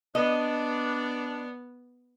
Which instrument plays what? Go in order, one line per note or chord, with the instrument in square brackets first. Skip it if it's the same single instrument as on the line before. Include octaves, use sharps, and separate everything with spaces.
[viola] B3 [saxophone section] D4 [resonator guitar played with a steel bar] D#5